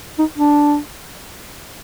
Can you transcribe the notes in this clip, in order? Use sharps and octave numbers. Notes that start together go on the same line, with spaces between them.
D#4
D4